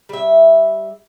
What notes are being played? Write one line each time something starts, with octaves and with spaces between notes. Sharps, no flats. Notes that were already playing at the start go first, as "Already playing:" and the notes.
G3 E5